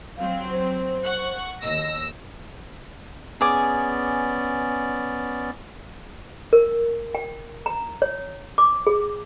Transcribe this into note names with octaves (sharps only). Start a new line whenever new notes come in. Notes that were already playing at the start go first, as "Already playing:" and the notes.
F#3 C4 F5
C5
F#5 C#6 F#6
D#2 D#5 E6 A#6
B3 C#4 G#4 D5 G#5 D6
A#4
G5
A#5
C#5
D6
G#4